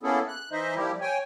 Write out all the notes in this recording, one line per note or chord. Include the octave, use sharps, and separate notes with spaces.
A#3 B3 C#4 E4 G#4 A4
F#6
E3 D#4 C5 D#5 E5
F3 G3 A#3 E4 G4
C#5 G5 G#5